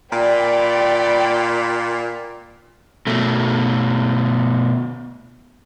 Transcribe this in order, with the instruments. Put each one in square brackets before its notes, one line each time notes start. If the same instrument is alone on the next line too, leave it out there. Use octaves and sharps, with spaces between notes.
[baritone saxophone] A#2 [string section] D5 G5 B5
[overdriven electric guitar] B2 A3